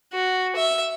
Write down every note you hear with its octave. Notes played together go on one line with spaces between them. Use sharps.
F#4
E5